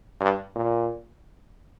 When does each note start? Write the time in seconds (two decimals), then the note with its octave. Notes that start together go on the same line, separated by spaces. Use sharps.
0.20 G2
0.56 A#2